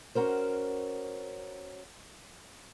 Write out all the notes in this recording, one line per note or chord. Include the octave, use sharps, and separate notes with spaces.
C#4 F#4 A#4 C5